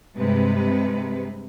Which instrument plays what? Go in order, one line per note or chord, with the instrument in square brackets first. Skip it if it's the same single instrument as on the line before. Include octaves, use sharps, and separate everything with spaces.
[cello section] G2 C3 G#3 B4